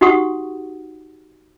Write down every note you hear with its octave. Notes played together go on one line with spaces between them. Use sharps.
D#4 F#4 G4 F#5 C#6 D#6